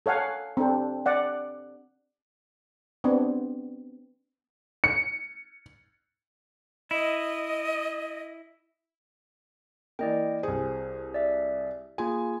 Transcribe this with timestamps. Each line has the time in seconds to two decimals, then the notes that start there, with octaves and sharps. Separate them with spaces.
0.06 A4 C#5 F5 F#5 G#5
0.57 C4 D4 A4
1.06 D5 F#5
3.04 B3 C4 D4
4.84 C#7
6.91 E4 D#5
9.99 E3 A#3 D5 D#5 G5
10.43 C2 G#4 C5
11.14 D5 E5
11.98 A#3 F4 G#4 G#5